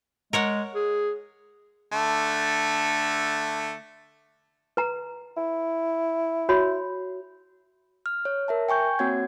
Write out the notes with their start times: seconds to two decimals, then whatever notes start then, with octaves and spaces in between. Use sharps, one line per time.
0.33 G#3 A#4 C#5 F#5
0.75 G#4
1.92 D3 A3
4.77 B4 A#5
5.37 E4
6.49 F#4 C#5 B5
8.06 F6
8.25 C#5
8.48 A#4 E5 A5
8.69 G5 G#5 C#6 G6
8.99 A#3 C4 F#4 C#5 F#5 G#6